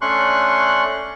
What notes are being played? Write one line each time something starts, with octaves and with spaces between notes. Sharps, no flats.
A3 C#4 D4 C6 C#6 F#6